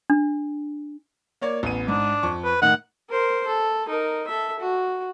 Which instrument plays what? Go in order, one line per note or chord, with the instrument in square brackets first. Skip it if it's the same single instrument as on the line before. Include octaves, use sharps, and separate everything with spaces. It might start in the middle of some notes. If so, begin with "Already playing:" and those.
[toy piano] D4
[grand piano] A#3 C#5 D5
A1 B3 D#7
[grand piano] G#2 [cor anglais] D4
[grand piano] F2 C#6
[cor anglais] B4
[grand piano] A2 D#3 [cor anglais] F#5
[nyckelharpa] A#4 C5
A4
D#4 A#4
A4 E5
F#4